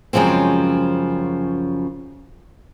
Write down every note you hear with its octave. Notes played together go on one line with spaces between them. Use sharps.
F#2 C#3 F3 G#3 C4